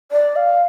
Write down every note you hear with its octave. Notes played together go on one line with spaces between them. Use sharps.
D5
F5